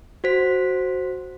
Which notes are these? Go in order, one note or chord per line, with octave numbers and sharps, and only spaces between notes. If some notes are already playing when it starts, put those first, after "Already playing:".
F#4 C5 B6